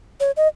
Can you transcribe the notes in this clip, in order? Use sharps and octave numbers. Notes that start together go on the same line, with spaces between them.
C#5
D#5